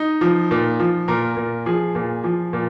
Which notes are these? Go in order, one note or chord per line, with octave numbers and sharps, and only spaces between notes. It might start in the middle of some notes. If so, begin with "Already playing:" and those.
Already playing: D#4
F3
A#2
F3
A#2 A#4
A#2
F3 G#4
A#2
F3
A#2